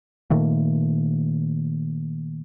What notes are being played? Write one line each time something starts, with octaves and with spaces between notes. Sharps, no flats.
A#2 D#3 A3 A#3